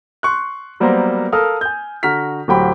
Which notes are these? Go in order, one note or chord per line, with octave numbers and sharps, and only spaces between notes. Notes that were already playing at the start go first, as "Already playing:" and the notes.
C6 C#6 F#6
F#3 G3 A#3 B3 A#4 C5
A4 A#4 F5 D#6 F6
G#5 G6
D3 F#4 A#5 F6 B6
D1 F#3 G4 G5 B5